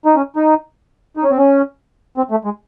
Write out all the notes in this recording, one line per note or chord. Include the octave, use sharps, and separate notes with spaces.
D#4
C#4
D#4
D#4
C#4
C4
C#4
C4
A3
G#3